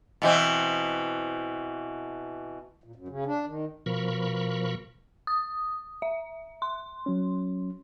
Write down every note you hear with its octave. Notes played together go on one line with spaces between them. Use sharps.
B2 E3 C4
A#2
F#2
C#3
D4
D#3
B2 F3 A#4 B5 C#6
D#6
E5
C6
F#3 C#4